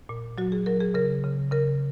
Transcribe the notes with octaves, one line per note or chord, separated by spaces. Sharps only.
A#2
F#3 F#4
G#4
F#3 A#4
G#4
C#3 A#4
C#3
C#3 A#4